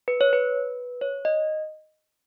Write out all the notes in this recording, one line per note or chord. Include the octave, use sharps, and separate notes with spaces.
B4
C#5
B4
C#5
D#5